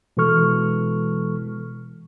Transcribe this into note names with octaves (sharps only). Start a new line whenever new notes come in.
B2 E3 G#3 A4 C#6 F6